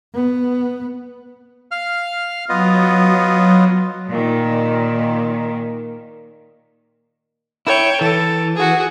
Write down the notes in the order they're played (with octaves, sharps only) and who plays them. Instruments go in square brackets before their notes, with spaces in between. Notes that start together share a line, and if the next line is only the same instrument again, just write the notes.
[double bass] B3
[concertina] F5 F6
[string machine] F#3 [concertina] B3 F4 D#5
[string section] A#2 D#3
[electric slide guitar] E4 [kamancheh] C#5 G5
[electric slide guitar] E3 [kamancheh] A4
[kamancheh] F#4 G#4